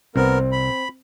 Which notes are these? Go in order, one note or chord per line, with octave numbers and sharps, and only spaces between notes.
C2 B3 C4 A#4
B5